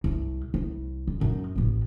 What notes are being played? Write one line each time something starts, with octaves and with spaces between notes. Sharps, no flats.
C2
C2
F1
F#2 D#4
A1 B3